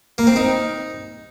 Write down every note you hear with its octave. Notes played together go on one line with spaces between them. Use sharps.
A#3
C4
D#4